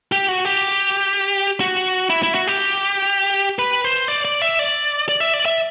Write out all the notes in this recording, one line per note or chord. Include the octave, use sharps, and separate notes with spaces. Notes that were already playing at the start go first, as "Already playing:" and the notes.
G4
F#4
G4
F#4
E4
E4
F#4
G4
B4
C5
D5
D5
E5
D5
D5
E5
D5
E5